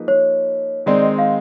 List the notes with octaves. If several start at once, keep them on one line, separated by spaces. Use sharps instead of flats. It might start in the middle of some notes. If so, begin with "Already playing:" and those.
Already playing: F3 A#3 D#4 G#4 B4
C#5
D#3 G#3 C4 D#4 D5
D#5
F5